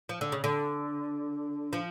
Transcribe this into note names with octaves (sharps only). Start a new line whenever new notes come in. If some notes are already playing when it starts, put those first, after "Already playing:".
F3
D3
C#3
D3
F3